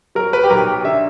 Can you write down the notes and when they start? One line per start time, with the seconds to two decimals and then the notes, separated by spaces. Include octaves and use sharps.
0.15 F#3 A#4
0.33 B4
0.44 G4
0.50 B1 A#4
0.68 G4
0.84 D3 E5